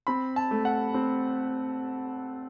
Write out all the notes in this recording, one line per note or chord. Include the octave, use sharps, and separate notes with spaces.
C4 B5
A5
A3
F#5
C4